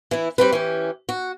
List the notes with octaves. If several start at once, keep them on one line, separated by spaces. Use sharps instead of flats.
E3 E4
G3 C4 B4
E3 C#4 G4
F#4